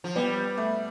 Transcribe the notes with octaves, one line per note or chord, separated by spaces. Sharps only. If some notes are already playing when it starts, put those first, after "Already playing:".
F3
G3 B3
A3